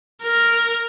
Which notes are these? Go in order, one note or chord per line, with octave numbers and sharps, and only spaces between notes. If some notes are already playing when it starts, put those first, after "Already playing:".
A#4